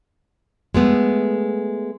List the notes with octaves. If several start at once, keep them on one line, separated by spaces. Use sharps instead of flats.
G#3 A3 B3